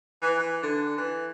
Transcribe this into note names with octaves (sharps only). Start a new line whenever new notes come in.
E3
E3
D3
E3